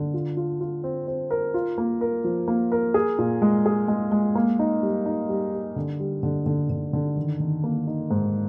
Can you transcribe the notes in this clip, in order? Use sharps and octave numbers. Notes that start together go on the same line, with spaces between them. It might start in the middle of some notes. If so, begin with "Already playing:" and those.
Already playing: D3
F4
F4
F4
C4
C4
A#4
F4
A#3
A#4
F3
A#3
A#4
G#4
A#2
G#3
G#4
G#3
G#3
A#3
D#4
G3
D#4
G3
G4
D3
G3
D3
D3
D3
D3
D#3
D#3
A#3
D#4
G#2